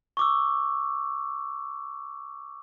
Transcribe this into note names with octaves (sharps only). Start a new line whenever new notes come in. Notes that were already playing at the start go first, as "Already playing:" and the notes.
C#6 D6 E6